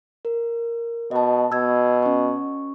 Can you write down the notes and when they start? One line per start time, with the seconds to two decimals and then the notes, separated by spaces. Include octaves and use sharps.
0.25 A#4
1.11 B2 D#5 A5
1.52 B2 E6 G#6
2.03 C#4 C#6